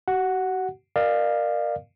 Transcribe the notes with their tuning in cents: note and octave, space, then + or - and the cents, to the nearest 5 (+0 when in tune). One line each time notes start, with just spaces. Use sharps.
F#4 +40 F#5 +0
A#4 +0 D5 +40 F5 +0